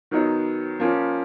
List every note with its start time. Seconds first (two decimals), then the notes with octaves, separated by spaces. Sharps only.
0.11 D#3 F#3 B3 D#4
0.80 F3 A#3 C#4